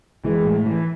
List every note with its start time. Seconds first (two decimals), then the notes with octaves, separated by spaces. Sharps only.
0.24 E3 G#3
0.45 A2
0.66 E3